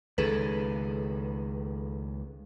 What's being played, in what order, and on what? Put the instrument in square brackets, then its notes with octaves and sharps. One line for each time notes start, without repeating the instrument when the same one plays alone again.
[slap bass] C#2 D#3 [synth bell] G#4 A4 B4